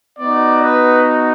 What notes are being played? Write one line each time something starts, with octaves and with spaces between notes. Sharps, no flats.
B3 D#4 F#4 D5
B4